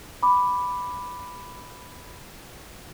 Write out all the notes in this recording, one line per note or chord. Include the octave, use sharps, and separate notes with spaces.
B5 D6